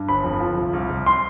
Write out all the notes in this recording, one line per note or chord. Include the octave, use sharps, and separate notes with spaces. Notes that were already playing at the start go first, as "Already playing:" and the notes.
Already playing: G2
G1 B5
F2
F3
C2
C2
C2
C6